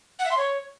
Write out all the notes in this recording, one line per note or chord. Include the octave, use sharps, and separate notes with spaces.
F#5
E5
C6
C#5